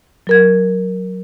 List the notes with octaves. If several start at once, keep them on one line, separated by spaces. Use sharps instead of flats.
F#3 A#4 G#6